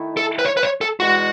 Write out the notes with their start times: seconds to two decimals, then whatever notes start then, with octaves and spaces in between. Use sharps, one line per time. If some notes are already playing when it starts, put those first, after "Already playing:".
Already playing: D#3 A3 E4
0.17 A4
0.39 B4
0.45 C#5
0.57 B4
0.63 C#5
0.81 A4
1.00 E2 B2 G#3 F#4